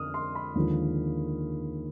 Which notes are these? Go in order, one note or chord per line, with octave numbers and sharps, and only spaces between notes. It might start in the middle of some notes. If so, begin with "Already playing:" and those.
Already playing: F2 D3 D#6 F6
C6
B5
D#2 D3 F3 G#3